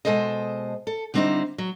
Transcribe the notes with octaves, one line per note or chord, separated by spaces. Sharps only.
B2 E3 G#3 A4 C5 D#5
A4
D3 G3 C4 D#4 E4 C5
F#3